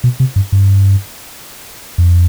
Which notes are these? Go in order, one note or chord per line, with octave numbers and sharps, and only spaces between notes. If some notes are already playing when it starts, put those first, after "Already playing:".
B2
C3
G2
G2
F2